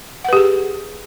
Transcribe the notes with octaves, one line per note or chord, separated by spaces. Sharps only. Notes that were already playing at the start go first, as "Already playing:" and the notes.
G4 G#4 B4 F#5